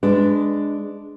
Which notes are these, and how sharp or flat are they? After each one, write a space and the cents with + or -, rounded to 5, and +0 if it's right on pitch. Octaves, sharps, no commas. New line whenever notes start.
G#3 +0 D4 +0 B4 +25